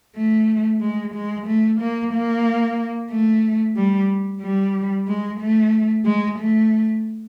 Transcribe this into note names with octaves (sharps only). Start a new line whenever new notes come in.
A3
G#3
G#3
A3
A#3
A#3
A3
G3
G3
G#3
A3
G#3
A3